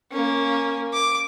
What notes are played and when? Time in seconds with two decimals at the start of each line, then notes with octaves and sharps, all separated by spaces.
0.12 A#3 C#4
0.93 D6